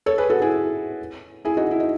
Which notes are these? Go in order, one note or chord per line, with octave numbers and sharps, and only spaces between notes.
A4 C#5
G#4 B4
F#4 A4
E4 G#4
E4 G#4
D#4 F#4
E4
D#4